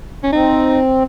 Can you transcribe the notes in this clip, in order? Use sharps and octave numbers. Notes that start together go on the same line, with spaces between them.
C#4
C4 D#4